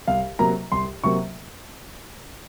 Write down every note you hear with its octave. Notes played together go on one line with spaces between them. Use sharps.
C2 F5
C3 F#3 A#3 A#5
C2 C6
C3 F#3 A#3 C#6